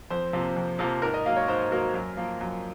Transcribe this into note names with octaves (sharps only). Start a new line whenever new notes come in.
F2 C5
C3 F3 A#3
F2
C3 F3 A#3
G#2 A#4
D#5
F#3 A#3 F5
C#5
G#2 C5
F#3 A#3 A#4
F#2
F3 A#3
F#2